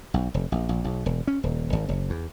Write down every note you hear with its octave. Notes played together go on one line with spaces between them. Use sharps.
B1
F1
A#1
A#1
B1
E1
C#4
D#1
G#1
F#1
E2